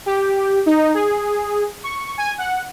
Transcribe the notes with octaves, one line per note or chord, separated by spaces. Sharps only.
G4
D#4
G#4
C#6
G#5
F#5